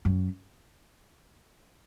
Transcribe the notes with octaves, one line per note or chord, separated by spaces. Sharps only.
F#2